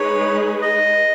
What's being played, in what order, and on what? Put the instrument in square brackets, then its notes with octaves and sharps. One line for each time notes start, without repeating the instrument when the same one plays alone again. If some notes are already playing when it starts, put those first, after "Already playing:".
Already playing: [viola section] G#3 D#4 G#4 B4 [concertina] C#5
[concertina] D#5